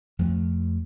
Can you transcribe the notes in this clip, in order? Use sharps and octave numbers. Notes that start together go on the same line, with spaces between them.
F2 F3 A3